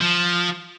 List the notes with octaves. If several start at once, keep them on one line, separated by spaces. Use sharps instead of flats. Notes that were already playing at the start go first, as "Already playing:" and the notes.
F3